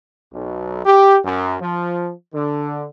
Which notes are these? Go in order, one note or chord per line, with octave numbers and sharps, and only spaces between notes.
B1
G4
F#2
F3
D3